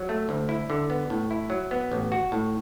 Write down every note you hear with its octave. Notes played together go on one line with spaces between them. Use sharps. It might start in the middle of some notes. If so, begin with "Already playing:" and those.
Already playing: F#3
A3
D2
E4
D3
B3
A2
E4
F#3
B3
A1
F#4
A2